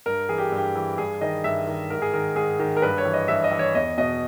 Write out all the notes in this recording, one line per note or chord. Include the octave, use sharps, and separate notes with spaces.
G2 A#4
E3 G#4
G4
G2 G4
E3
G2 G#4
D#3 D#5
G2 E5
D#3
G#2 A#4
G#4
D#3 A#4
G#2 G#4
D#3
A#4
G2 B4
C#5
E3
D#5
G2 E5
D#5
E3
C#5
E2 D#5
B2 D#5